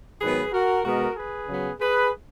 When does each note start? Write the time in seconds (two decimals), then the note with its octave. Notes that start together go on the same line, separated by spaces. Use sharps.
0.20 G#2 D#3 F#3 B3 G#4 B4
0.52 F#4 A#4
0.84 B2 G#3 B3 F#4 A#4
1.16 G#4 B4
1.48 C#3 F#3 B3
1.80 G#4 B4